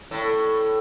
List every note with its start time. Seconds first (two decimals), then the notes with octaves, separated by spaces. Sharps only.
0.11 A2